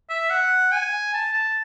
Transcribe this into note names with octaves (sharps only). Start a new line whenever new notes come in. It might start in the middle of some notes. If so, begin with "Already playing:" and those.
E5
F#5
G#5
A5
A5